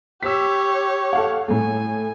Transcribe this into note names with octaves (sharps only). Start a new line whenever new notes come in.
G4 C#5 E6 B6
A4 F5 F#5
A2 A3 G#5